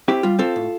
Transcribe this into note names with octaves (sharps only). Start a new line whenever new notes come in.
C4 E4 G4
G3 F4
C4 F4 A4
A2